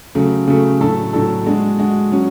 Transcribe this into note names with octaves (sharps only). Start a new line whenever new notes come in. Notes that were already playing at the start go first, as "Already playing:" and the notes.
C#3 F#3 A3
C#3 F#3 A3
A2 F#3 A3 D4 A4
A2 F#3 A3 D4 A4
G#3 D4 F#4
G#3 D4 F#4
F#3 C#4 F#4